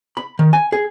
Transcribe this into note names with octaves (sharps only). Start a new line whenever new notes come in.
B5
D#3
G#5
G#4